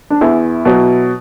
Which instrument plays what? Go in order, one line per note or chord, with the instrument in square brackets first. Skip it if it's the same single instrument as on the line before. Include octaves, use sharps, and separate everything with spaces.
[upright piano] D4
E2 E4
B2 F#3